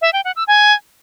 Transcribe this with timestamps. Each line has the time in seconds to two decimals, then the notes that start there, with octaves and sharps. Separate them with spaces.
0.02 E5
0.13 G5
0.25 F#5
0.36 E6
0.48 G#5